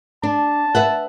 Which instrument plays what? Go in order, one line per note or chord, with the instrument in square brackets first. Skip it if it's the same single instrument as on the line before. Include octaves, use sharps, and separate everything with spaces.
[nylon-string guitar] D4 [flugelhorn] A5
[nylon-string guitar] B4 E5 F#5